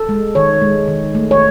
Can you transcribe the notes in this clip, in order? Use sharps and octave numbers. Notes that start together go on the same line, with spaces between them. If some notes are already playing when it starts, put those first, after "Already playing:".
Already playing: A4
G#3
D#3 C#5
G#3
D#3
A3
C#5